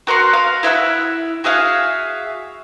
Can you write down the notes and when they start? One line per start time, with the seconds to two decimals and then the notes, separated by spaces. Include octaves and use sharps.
0.07 F#4 A#4 F#5 C6
0.33 F5
0.63 E4 E5 F#5 E6
1.44 F#4 G#4 E5 F5